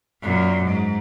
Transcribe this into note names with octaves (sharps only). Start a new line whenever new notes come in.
F#2 A#2
G#2